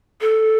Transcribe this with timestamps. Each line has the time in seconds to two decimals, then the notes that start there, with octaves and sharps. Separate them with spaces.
0.21 A4